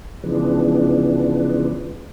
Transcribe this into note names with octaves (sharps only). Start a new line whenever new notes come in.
C#3 E3 F3 G#3 B3 D4